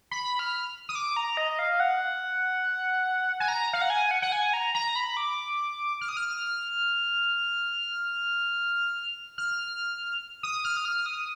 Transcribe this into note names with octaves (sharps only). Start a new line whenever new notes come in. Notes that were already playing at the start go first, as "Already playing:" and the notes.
B5
F6
D#6
D6
A#5
D#5
F5
F#5
G#5
A#5
F5
F#5
G#5
F#5
F#5
G#5
A#5
A#5
B5
D6
F6
D#6
F6
F6
D#6
F6
D#6
F6
D#6